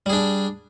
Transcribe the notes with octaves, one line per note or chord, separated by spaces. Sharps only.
G3 D4 G#4